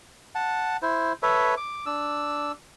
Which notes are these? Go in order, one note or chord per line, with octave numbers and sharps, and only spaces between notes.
F#5 A5
E4 C5
A4 B4 C#5 E5
D6
D4 E6